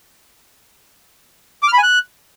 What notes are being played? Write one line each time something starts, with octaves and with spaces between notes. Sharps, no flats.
D6
F6
B5
G#5
F#6